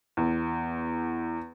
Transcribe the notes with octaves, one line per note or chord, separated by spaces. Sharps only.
E2